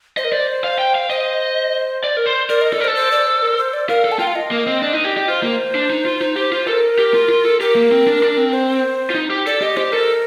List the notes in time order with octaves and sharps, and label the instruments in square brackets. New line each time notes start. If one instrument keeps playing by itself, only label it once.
[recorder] C5 [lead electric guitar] D#5
[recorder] A#4
[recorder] C5 [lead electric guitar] D5
[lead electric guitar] F5
G5
F5
[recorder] C5 [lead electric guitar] D#5
[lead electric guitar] D5
A#4
C5
[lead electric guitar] A#4 [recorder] D5
[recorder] D#5
[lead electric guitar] A4 [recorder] D5
[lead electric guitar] A#4
[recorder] C5
[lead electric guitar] A4
[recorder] C5
D5
C5
A#4
C5
D5
[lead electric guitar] A#4 [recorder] F5
[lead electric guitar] A4
[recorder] A5
[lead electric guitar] F4 [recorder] G5
[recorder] F5
D#5
[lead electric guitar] A#3
C4
D4
D#4
G4
G4
[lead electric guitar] F4 [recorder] C5
[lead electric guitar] A#3
D4
D#4
F4
D#4
G4
F4
[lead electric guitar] A4 [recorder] A#4
[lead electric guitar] G4
F4
F4
A4
[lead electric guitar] G4 [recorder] A#4
[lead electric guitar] A#3
C4
D4
D4
C4
[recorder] C5
[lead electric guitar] F4
D#4
G4
[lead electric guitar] A4 [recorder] D5
[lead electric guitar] G4 [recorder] D#5
[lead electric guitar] G4 [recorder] C5
[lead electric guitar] A4 [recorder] A#4